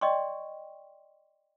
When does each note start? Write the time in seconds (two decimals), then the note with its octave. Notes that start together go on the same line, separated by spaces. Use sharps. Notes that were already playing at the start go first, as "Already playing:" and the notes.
0.01 D5 D#5 G5 C6 C#6